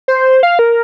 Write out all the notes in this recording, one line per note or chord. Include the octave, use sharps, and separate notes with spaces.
C5
F5
A#4